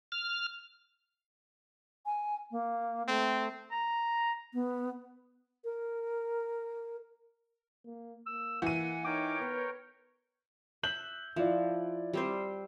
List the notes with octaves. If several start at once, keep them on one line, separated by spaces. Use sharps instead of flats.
F6
G#5
A#3
A3 C4
A#5
B3
A#4
A#3
A#3 E6
E3 F#5 D#7
D#4 A#4 C#5 G5 D6
B3 B4
E5 F#6 G6 F#7
F3 E4 D5
G3 C4 C5